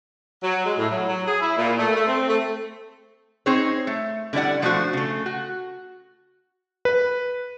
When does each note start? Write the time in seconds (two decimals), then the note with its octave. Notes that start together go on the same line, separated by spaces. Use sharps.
0.42 F#3
0.64 G#3
0.77 A2
0.89 F#3
1.06 F#3
1.26 G#4
1.40 E4
1.57 A#2
1.79 A3
1.94 A3
2.07 C4
2.27 A3
3.46 C4 D#4 G#4 C5 C#5
3.87 A3
4.33 D3 G3 E4 D5 F#5
4.62 F3 A3 D4 F4 F#4 C5
4.93 C#3 A3
5.26 F#4
6.85 B4